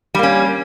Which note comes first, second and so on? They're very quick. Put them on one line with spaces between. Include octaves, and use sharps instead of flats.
G3 A#3 C#4